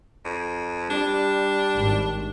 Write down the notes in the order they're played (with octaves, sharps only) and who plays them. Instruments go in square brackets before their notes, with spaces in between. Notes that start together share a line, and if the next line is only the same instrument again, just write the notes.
[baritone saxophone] F2
[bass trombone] G3 [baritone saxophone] D4
[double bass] G#1